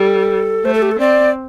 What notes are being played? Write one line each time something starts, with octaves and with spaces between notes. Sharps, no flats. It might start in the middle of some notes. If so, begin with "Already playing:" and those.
Already playing: G3 A4
A3 C5
A4
G4
A4
C4 D5